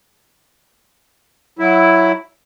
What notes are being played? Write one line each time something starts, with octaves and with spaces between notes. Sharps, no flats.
F#3 E4